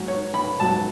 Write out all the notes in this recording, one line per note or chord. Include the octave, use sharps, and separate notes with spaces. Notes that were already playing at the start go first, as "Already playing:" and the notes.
Already playing: G#2 F#3
C#5
B5
G#2 F#3 A5